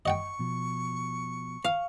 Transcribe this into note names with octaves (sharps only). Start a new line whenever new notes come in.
D#5 F#5 G5 C#6
B2 F3
F5